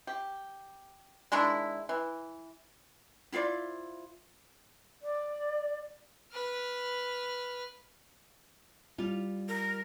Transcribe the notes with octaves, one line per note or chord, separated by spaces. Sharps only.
G4
D#3 G#3 D4 E4
E3
E4 F4 C5 D5
D5
B4 F6
G3 F4
A#4